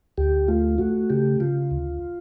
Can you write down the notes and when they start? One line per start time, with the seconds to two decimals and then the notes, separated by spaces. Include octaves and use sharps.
0.18 D2 G4
0.48 A3 F4
0.78 A3 F#4
1.10 C#3 G4
1.40 C#3 F4
1.71 D2